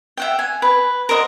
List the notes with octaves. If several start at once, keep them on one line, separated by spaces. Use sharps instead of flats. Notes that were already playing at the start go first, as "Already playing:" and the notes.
E5 F#5 G5
G#5
B4
A#4 C5 D#5 F#5